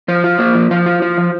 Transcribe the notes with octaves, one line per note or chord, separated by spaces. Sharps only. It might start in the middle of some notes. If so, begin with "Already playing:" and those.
F3 C5
F4
A#3 C5
F3
F3 C5
F4
F4
F3